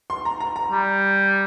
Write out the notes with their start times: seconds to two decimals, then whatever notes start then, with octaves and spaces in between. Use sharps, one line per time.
0.10 C6
0.25 A#5
0.40 A#5
0.56 A#5
0.72 G3